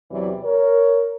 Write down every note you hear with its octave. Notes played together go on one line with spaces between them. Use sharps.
E2 C3 E3 F#3 D5
A#4 C#5